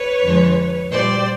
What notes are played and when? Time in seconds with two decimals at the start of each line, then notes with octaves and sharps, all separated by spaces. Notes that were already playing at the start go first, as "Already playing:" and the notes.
Already playing: B4 C#5
0.23 F2 D3 F3 G#3
0.91 A#2 G3 C5 D5